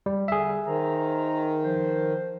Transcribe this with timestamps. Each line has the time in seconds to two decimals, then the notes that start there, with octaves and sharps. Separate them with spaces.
0.06 G3
0.28 D3 G3 G#4 E5
0.66 D#3 C5 A#5
1.64 F3 C5